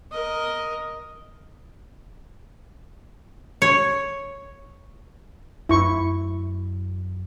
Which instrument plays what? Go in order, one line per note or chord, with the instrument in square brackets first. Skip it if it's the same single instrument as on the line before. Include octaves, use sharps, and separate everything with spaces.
[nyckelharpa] A#4 D#5
[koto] C#5
[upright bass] F#2 [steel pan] E4 C#6